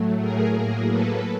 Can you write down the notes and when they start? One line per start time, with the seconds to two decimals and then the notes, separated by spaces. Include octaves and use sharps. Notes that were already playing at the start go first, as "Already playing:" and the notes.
Already playing: A2 F#3 A3
0.19 G#4 A#4
0.55 A2 F#3 A#3
0.90 A4 B4